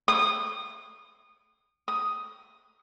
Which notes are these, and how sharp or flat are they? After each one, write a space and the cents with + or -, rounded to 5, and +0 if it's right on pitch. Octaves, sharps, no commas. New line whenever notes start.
D#6 -25
D#6 +5